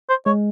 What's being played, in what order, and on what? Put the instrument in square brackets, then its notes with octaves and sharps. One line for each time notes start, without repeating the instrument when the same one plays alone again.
[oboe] C5
[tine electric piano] G#3 [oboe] C#5